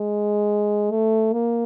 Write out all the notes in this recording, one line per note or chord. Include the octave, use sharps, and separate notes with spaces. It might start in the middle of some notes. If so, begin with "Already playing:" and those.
Already playing: G#3
A3
A#3